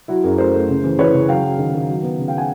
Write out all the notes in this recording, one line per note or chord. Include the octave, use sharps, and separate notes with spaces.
F#3 E4 F#4
F#2 G#4 A#4
A3 A#4 C5
A3
C#3
E3
E3 B4 C#5
C#3
F#3 F5 G5
F#3
D#3
D#3
F#3
B3
C#3
F5 G5
F#5 G#5